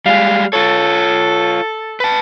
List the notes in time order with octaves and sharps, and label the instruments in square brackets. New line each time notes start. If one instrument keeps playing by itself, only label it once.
[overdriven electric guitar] G3 G#3 [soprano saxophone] F5
[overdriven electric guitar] F4 C#5 [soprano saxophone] A4
[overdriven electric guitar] B4 A5